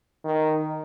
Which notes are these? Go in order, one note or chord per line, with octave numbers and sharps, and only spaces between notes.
D#3